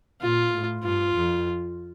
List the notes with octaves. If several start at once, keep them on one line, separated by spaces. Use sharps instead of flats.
A#2 F4
A2
G2 F4
F2